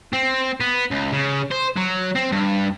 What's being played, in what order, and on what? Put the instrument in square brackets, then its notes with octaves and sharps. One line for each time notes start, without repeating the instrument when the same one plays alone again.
[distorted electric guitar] C4
B3
C#2
C#3
C5
F#3
C4
G2